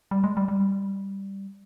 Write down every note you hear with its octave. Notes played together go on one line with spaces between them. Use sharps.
G3
G#3
G3
G3